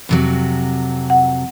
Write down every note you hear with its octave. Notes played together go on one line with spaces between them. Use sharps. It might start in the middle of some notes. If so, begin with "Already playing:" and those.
F2 C3 F#3
F#5